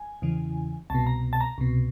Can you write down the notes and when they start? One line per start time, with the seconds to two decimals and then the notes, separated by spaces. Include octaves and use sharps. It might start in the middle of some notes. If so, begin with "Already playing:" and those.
Already playing: G#5
0.22 E2 C#3 E3
0.90 C2 B2 A5
1.07 A#5
1.33 A5
1.41 A#5
1.58 C2 B2